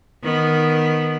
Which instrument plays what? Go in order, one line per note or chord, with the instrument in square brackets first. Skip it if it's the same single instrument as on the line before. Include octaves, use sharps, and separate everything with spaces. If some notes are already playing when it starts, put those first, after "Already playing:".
[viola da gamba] D#3 B3